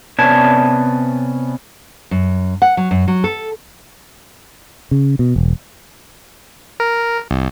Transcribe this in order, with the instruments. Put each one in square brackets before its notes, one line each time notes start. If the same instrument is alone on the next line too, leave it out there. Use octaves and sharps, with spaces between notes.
[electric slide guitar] C3 B3 C#4 C#5 D5 A5
[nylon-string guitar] F#2
F#5
F#3
F#2
F#3
A4
[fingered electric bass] C#3
B2
E1
[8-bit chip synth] A#4
C2